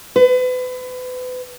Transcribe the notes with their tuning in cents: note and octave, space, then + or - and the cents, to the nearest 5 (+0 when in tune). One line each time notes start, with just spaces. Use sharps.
B4 +35